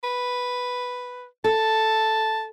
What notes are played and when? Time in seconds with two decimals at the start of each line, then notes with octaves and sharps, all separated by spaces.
0.03 B4
1.44 A4 A5